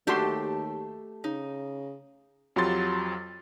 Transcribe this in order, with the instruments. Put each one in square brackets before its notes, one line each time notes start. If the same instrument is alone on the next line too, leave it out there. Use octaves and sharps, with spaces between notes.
[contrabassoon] D#2 [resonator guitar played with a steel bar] A3 G4 A4 [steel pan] D4 F#4 C6
[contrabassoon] C#3 [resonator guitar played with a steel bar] D#4
[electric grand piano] F2 F#3 F4 G4 C6 A6